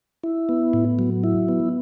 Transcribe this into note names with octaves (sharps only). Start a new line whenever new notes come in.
E4
B3
A2
F#3
E4
B3